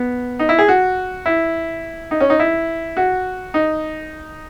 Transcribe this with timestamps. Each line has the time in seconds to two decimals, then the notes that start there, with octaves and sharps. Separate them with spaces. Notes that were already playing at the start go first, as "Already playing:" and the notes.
Already playing: B3
0.39 D#4
0.49 E4
0.59 G#4
0.68 F#4
1.26 E4
2.11 D#4
2.20 C#4
2.30 D#4
2.40 E4
2.97 F#4
3.54 D#4